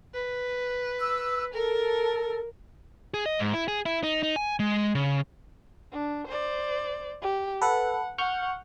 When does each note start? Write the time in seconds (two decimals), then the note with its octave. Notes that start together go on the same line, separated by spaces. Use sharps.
0.14 B4
1.00 E6
1.54 A4 A#4
3.14 G#4
3.26 D#5
3.39 G#2
3.54 E4
3.68 G#4
3.86 E4
4.03 D#4
4.23 D#4
4.36 G#5
4.60 G#3
4.95 C#3
5.92 D4
6.27 C5 D5
7.22 G4
7.62 A4 B4 F#5
8.18 F#5 C#6 F6 G6